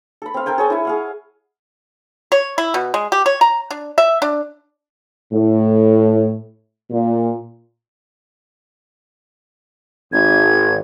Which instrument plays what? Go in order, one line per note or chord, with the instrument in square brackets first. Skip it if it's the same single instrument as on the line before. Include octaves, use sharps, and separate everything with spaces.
[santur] A4 B5
C4 F5
A4 A#4 G5 G#5
G#4 C#5 G#5 A5
E4 E5 G#5
G#4 F5 F#5
[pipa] C#5
E4
B2
G#3
G4
C#5
A#5
D4
E5
D4
[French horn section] A2
A#2
[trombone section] G#1 [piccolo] G#6